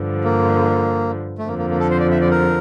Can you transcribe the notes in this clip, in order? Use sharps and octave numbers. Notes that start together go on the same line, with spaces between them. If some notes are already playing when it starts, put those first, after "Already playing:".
Already playing: G2 D3 F3
A#3
A3
F2 D3 F3 A#3
A#3
A#3
A4
C5
D5
E5
D5
A#4